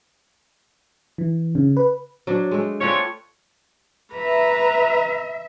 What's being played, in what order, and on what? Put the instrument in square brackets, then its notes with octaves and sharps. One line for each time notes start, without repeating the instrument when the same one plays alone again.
[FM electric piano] E3
C#3
B4
[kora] F#3 D4
G#3 A3
[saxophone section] F2 C#5 [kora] A3 D4 F4
[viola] B4 A#5 [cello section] E5